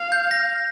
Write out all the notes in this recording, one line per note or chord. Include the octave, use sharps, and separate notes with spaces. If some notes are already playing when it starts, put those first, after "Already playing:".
Already playing: F5
G6
A#6